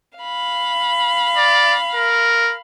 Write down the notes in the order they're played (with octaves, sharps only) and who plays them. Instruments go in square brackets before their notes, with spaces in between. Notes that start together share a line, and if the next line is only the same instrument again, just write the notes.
[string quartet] F5 B5
[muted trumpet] D5
A#4